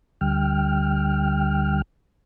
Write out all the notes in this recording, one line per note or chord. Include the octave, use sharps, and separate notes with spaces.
D2 D3 G3 G5 F6